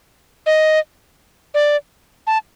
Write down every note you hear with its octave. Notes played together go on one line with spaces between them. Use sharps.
D#5
D5
A5